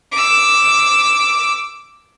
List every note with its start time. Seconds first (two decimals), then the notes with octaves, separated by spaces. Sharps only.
0.12 D6 E6